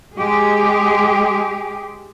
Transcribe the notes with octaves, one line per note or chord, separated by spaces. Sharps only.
G#3 G4 G#4